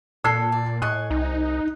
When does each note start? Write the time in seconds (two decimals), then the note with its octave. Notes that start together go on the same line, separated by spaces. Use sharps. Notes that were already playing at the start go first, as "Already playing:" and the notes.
0.24 A#2 A4 E6 G#6 C7
0.52 D5
0.82 A2 D#5 G#5 C#6 F#6
1.10 C2 D#4